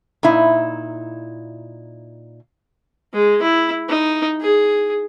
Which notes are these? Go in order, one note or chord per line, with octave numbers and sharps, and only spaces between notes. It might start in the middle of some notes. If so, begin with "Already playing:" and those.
A#2 D#4 E4
G#3
E4
D#4
G#4